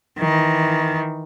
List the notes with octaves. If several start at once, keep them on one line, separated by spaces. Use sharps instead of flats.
D#3 E3